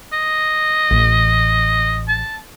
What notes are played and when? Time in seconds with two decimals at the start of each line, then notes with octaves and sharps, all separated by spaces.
0.13 D#5
0.91 A1
2.08 A5